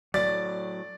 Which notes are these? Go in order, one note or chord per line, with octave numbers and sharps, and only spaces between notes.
A2 F#3 D5 A6